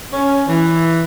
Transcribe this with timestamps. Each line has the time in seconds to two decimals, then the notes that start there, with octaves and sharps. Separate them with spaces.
0.13 C#4
0.48 E3